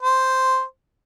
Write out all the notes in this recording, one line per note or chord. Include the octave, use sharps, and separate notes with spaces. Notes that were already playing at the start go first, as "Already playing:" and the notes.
C5